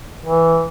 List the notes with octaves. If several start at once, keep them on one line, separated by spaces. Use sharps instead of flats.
E3